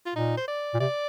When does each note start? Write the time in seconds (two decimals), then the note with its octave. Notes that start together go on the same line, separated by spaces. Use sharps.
0.06 F4
0.15 A#2 D#4
0.37 C5
0.48 D5
0.74 A#2
0.80 C3 D5